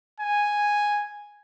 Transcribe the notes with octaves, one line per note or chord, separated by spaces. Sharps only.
G#5